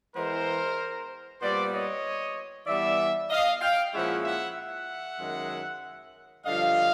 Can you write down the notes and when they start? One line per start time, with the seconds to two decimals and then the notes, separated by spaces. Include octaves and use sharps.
0.15 E3 G#3 B3 A#4 C5
1.41 A#2 G3 B3 C5 D5
1.73 C#5 D#5
2.67 E3 G3 B3 D5 E5
3.30 D#5 F5
3.61 F5 G5
3.93 A#2 F3 G#3 C#4 E4 E5 F#5
4.24 E5 F#5
4.56 E5 F#5
5.19 F#2 D#3 G#3
6.45 G2 D3 F3 D#5 F5